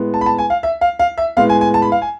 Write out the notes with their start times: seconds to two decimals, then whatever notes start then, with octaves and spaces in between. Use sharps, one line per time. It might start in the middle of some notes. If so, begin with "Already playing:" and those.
Already playing: A2 G#3 B3
0.14 A5
0.21 B5
0.26 A5
0.38 G#5
0.50 F5
0.63 E5
0.81 F5
0.99 F5
1.18 E5
1.37 A2 G#3 B3 F5
1.49 G#5
1.61 G#5
1.74 A5
1.82 B5
1.92 F5
2.02 G#5